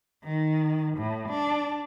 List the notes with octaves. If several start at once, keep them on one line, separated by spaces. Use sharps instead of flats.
D#3
A2
D4